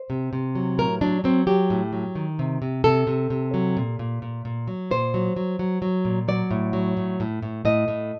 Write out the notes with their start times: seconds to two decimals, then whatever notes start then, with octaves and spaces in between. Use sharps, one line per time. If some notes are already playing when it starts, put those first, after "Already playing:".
Already playing: C5
0.10 C3
0.33 C3
0.55 F#3
0.78 A2 A#4
1.01 F#3 D4
1.24 F#3 C4
1.47 F#3 G4
1.70 A2
1.93 F#3
2.15 D#3
2.39 C3
2.62 C3
2.84 C3 A4
3.07 C3
3.30 C3
3.54 F#3
3.77 A#2
3.99 A#2
4.22 A#2
4.45 A#2
4.67 F#3
4.91 A#2 C5
5.14 F#3
5.36 F#3
5.59 F#3
5.82 F#3
6.05 A#2
6.28 F#3 D5
6.51 A2
6.73 F#3
6.97 A2
7.20 A2
7.42 A2
7.65 A2 D#5
7.88 A2